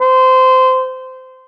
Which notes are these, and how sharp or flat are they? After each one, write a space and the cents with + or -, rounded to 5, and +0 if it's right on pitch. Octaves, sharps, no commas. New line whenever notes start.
C5 -20